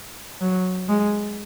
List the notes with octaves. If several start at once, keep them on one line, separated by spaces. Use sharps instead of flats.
F#3
G#3